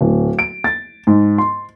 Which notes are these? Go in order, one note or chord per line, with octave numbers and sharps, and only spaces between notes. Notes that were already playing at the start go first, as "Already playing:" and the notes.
D1
D7
A6
G#2
C6